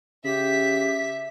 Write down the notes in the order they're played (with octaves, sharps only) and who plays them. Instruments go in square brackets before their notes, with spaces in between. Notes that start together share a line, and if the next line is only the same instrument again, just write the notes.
[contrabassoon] C#3 [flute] G4 [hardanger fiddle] E5 [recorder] B6